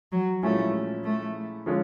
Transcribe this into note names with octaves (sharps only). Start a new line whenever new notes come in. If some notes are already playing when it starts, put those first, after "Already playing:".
F#3
A#2 F3 G#3 A3 C#4 E4
A3
D3 F3 G#3 C#4 F4